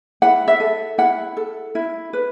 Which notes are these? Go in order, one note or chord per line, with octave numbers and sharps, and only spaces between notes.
E4 F#5
E5
A4
E4 F#5
A4
E4
B4